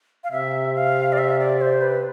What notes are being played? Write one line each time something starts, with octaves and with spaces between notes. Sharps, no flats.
F5
C3 E5
F5
D5
E5
D5
C5
B4